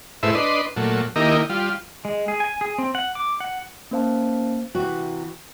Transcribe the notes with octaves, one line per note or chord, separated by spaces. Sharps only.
G#2 A3 E4 B4 C5 E5
D4 B4 D#5 C6
A#2 F#3 A3
D#3 A#3 D#4 E4 G4 A#4
G3 F4
G#3
G#4
G#5
G#4
C4
F#5
D6
F#5
A#3 C#4 C5 F5 A5
C3 E3 F#4